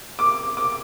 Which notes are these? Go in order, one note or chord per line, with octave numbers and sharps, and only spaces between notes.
D6
D6